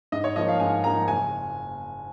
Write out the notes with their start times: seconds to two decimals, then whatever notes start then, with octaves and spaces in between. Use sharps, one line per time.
0.12 G#2 D#5
0.24 C#5
0.36 F3 A#3 D#4 D#5
0.49 F5
0.60 G#2 G#5
0.84 F3 A#3 D#4 A#5
1.08 F#1 G#5